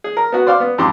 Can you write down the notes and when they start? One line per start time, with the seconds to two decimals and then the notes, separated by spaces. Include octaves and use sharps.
0.04 G#4
0.17 A#4
0.32 B3 F#4
0.47 C5 D5 F5 C6 D6
0.60 B3
0.78 F2 G#2 G4 A5 C6 D6